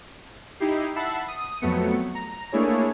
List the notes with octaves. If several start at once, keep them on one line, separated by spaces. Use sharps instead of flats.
D#4 E4 G4 C7
E5 F#5 A5 B5 E6 C7
D#6
F2 F#3 A3 B3 C#7
A#5
A3 A#3 D4 E4 G#4 C#5